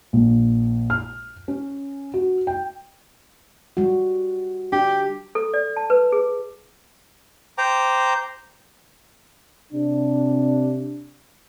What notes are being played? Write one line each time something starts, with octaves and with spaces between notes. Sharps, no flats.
A#1
F6
C#4
F#4
G5
G3 F#4
D4 G4
A4
D5
A5
B4
G#4
C5 G5 A#5 D6
C3 D4